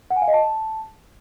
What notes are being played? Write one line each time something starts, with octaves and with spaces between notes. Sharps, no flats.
F#5
G#5
F5
D#5
A5